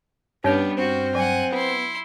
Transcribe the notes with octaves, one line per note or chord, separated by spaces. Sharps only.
G2 B3 C#4 D4 C#5 G5 F6
C4 F#4
F#3 F#5 G#5
B3 E4 C6